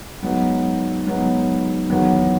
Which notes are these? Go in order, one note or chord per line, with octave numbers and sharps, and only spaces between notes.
G#2 F#3 B3 D#4
G#2 F#3 B3 D#4
E2 D#3 F#3 B3